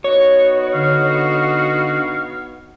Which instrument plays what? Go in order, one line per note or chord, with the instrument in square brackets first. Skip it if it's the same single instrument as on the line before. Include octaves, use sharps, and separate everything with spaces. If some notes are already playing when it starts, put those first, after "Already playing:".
[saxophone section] B3 D#4 F#4 [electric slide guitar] C#5
[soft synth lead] D3 [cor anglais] F5